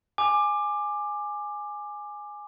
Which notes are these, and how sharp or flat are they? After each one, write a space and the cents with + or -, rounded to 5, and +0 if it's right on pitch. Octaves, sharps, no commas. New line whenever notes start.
G#5 +0 D6 +15